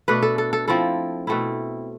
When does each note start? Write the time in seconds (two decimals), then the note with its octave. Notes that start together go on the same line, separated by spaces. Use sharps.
0.08 B2 A3 D4 B4
0.22 A4
0.38 A4
0.53 A4
0.68 F3 C4 E4 A4
1.27 B2 A3 C4 E4